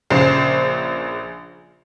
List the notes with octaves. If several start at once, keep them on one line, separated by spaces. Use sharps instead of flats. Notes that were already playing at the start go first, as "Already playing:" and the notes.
A#1 C#3 C5 C7